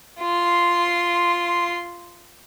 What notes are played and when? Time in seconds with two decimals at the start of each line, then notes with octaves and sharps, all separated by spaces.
0.20 F4 C6